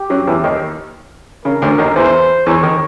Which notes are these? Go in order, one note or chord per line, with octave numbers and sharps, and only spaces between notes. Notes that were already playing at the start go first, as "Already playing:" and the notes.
Already playing: G4
F#2 F#3
E2 E3
D#2 D#3
C#3 A#4
D2 D3
D#2 D#3
E2 E3 C5
E2 E3 C#5
D#3